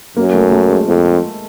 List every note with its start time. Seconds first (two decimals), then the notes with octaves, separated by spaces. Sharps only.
0.17 F#2 A#3
0.34 A3
0.52 A3
0.69 G#3
0.87 F2